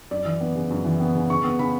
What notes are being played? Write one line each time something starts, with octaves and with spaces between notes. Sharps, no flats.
F#2 D5
E3
B3
C#3
F#2
E3
B3
C#3
C#3 C#6
B3
C#3 B5